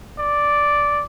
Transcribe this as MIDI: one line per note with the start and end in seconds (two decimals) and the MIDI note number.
0.19 1.04 74